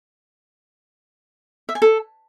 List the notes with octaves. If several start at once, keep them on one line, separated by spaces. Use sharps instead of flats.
E5
G#5
A4